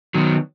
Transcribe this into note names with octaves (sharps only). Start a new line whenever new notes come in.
D#3 F#3 B3